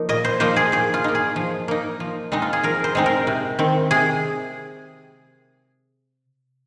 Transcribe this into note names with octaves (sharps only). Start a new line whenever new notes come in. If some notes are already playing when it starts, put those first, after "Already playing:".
Already playing: F3 A#3 D#4
A#2 D#5
C5
F3 A#3 D#4 C5
G#4
F3 G#4
F4
A#3 D#4
G#4
F3
A#3 D#4
F3
G#3 C4 D#4
F4
G#4
F3 A#4
C5
G#3 C4 D#4
A#4
C3
D#3 C4
C3 G#4